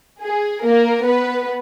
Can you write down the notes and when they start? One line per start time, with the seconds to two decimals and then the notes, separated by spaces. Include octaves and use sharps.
0.23 G#4
0.65 A#3 A#4
1.05 B3 B4